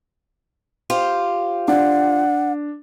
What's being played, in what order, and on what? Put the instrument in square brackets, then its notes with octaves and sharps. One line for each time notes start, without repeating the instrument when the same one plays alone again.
[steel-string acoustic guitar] F4 G4 C5
[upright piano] D4 [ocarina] F#5